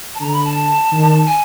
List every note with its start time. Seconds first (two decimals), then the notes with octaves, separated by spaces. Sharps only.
0.15 A5
0.21 D3 A#5
0.32 B5
0.44 A5
0.92 D#3
1.26 G#5